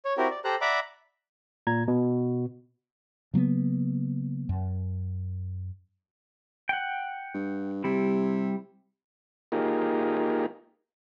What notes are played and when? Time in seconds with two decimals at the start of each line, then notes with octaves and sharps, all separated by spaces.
0.05 C#5
0.17 C4 E4 F#4 G4 A#4
0.30 D5
0.44 G4 A4 C5 A#5 F#6
0.61 D5 E5 F#5 A#5 B5 D6
1.67 A#2 A#5 G#6
1.88 B2
3.34 C#3 F#3 A#3 B3
4.49 F#2
6.69 F#5 G5
7.34 G2
7.84 C3 G3 E4
9.52 A#3 D#4 F4 G4 G#4 A#4